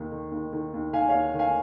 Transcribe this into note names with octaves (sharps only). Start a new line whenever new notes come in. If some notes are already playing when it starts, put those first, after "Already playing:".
Already playing: D#2 D#3
D#3
D#2
D#3
D#2
D#3 F5 G#5
C#5 F5
D#2
D#3
F5 G#5